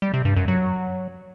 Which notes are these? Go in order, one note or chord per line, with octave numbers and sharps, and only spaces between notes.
G3
C3
G2
F#2
F#3